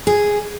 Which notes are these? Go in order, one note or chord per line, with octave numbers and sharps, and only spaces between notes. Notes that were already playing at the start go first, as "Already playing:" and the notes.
G#4